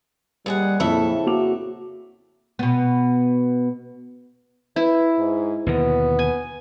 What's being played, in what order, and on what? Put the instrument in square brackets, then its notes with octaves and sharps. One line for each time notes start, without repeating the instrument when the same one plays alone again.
[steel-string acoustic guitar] D#2 G#4 F#5 [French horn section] G3
[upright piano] F2 A#2 [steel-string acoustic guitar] C#3 A4 E5 [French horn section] C4 E4
[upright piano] A#3 D6 F7 [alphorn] F#4
[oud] B2 B3
[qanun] E4 [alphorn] B4
[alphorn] G#2
[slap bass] D#2 B2 D3 [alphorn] B3
[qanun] G#5